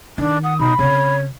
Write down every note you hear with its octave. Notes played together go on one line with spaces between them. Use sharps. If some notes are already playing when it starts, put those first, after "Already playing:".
D#3 D4
F#5 D#6
B2 D#4 B5
C#3 C4 C#5